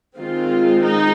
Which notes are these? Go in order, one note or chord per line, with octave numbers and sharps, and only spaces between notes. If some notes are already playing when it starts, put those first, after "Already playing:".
D#3 G#3 C4 F4
D#4